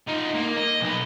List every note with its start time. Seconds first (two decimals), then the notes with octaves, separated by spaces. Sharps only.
0.08 D#4 F4
0.34 A#3
0.57 D#5
0.81 B1 B3